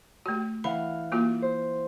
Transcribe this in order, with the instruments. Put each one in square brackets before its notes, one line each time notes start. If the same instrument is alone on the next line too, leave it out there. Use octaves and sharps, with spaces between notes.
[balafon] A3 F#4
[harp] E3 F5 F#5 [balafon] B5
[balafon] A#3 F4 F#4
[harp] C5